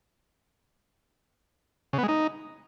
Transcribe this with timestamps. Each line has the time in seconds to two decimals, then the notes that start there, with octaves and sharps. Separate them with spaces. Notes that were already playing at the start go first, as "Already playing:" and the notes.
1.93 C#3
1.98 B3
2.03 G#3
2.08 D#4